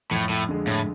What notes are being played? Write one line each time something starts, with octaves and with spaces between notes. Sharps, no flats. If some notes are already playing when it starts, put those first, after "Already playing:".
F2 A2
A2
D3 G#3
A2